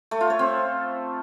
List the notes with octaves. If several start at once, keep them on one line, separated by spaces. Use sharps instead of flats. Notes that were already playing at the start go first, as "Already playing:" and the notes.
A3
F4
C#5
C4